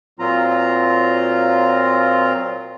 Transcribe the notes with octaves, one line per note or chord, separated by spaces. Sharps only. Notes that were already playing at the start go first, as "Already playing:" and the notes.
A#2 F#3 C4 F4 A#5